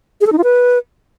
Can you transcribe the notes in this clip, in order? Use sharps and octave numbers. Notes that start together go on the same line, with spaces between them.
G#4
A4
D#4
F4
B4